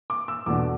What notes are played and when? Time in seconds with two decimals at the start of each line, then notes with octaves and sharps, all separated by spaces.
0.10 D6
0.28 E6
0.46 E2 B2 A3 D4 D6